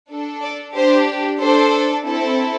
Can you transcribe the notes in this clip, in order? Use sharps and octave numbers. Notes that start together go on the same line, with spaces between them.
D4 A4
D5
D4 G4 C5
D4 A4 C5
C4 E4 A4